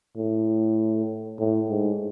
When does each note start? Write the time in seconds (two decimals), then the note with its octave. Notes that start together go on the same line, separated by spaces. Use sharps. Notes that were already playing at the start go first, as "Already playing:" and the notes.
0.17 A2
1.39 A2
1.70 G#2